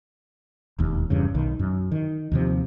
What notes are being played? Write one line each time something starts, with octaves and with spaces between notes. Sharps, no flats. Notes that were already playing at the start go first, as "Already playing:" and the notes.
E1 D#2
E2 G2 C#3
B1 D#3
F#2
D#3
D#2 C3 F3